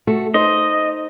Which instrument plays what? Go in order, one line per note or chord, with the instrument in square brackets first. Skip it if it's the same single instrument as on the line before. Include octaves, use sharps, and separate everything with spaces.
[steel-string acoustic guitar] A3 F#4 A4
[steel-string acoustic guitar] D#4 C5 [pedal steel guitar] D#5